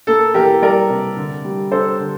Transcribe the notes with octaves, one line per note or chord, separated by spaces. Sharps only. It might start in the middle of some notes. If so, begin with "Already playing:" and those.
A#3 A4
E3 G4 A#4
G3 A#4 D5
C3
D3
G3
D4 A4 C5
D3